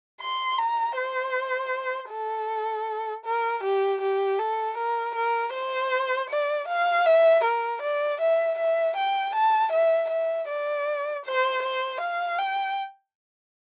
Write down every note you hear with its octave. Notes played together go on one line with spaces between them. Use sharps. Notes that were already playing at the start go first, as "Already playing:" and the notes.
C6
A#5
C5
A4
A#4
G4
G4
A4
A#4
A#4
C5
D5
F5
E5
A#4
D5
E5
E5
G5
A5
E5
E5
D5
C5
C5
F5
G5